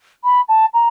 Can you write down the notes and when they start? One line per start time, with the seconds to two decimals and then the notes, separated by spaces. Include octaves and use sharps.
0.24 B5
0.49 A5
0.74 A#5